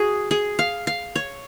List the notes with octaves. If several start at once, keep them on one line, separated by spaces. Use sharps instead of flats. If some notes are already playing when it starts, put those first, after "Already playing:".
Already playing: F#4 G#4
G#4
F5
F5
C#5